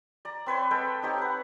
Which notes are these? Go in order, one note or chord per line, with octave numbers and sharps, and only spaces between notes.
D5 A#5
C4 B4 C#5 C6
G#3 A4 F#5 G5
C4 D#4 G4 C#5
B4 F#5